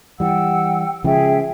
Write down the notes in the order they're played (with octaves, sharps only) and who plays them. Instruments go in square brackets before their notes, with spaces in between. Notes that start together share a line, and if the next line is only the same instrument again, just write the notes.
[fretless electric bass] E3 G3 [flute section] F#5 G5 E6
[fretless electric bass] C#3 F3 G#3 [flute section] G#4 E5 G5